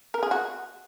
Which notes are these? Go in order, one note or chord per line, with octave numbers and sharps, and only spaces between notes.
A#4
G#4
F#4